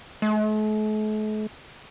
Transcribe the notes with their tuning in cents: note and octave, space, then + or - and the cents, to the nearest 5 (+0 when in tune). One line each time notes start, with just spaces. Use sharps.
A3 -45